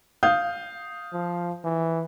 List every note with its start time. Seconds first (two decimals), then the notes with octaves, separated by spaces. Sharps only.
0.23 F5 D#6 G6
1.13 F3
1.65 E3